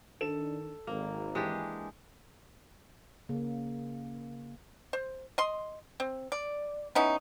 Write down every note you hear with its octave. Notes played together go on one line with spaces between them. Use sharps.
D#3 D4 A4 E7
G#1 A#3
E3 G#3 D4 G4
C#3 A#3
C5
D#5 C6
C4
D5
B3 C#4 D#4 E4